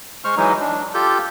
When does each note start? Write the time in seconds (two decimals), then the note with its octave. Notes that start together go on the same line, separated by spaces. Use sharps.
0.24 G#3 C5 C#6 F6
0.37 E3 F#3 G#3 D#4
0.60 D4
0.94 F4 G4 A4 G6